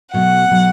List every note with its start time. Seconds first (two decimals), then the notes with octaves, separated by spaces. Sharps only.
0.13 B2 F#3 A3 F#5
0.51 B2 F#3 A3